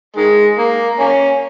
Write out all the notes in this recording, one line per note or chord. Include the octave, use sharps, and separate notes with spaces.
D#3 G#3
A#3
A#3 C#4